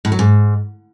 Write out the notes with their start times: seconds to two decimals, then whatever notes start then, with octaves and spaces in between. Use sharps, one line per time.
0.05 A2
0.12 F#3
0.19 G#2